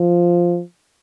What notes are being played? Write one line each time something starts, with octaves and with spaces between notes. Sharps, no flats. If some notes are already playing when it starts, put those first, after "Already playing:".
Already playing: F3